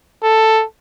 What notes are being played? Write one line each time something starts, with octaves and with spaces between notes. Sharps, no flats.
A4